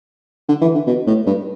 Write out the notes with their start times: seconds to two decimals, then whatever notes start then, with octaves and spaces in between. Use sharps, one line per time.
0.49 D3
0.62 E3
0.75 D3
0.87 B2
1.07 A2
1.27 G2